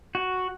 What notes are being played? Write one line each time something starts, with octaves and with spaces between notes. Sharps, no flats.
F#4